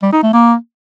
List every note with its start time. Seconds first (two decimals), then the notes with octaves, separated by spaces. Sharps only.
0.03 G3
0.13 D#4
0.23 A3
0.33 A#3